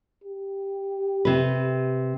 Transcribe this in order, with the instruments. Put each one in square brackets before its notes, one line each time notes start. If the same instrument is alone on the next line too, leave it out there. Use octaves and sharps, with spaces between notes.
[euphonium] G4
[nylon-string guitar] C3 B4